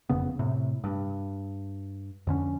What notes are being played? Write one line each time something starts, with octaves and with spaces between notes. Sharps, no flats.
F#1 F2 C#3 B3
A2 C3
G2
F2 D3 C#4